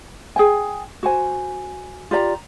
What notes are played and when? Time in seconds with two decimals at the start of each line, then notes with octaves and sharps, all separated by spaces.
0.36 G#4 G5 G#5
1.03 F#4 C5 G#5
2.11 F4 G4 D5 A#5